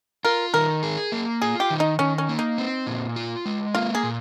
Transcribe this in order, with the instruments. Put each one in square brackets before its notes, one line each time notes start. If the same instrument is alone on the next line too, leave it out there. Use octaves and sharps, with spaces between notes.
[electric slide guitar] F4 [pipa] A#4
[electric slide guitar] D#3 [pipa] A#4
[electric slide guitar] G#4
A#3
[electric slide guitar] F4 [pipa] G#4
[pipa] G4
[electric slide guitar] D#3
[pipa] D#4
[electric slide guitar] D#3 [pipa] C#4
[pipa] C#4
[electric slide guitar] A#3
[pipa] D#4
[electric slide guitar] C4
A#2
F4
G#3
[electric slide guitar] A#3 [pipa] F4
[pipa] G#4
[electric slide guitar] A#2